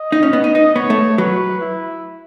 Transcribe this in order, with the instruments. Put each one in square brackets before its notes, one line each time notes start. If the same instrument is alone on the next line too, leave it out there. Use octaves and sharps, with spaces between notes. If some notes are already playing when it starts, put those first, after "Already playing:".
Already playing: [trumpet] D#5
[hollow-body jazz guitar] D#4
C#4
B3
D#4
D#4
[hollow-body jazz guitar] B3 [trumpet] C#5
[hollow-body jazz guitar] A3
[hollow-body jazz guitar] F#3 [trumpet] B4
[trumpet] E4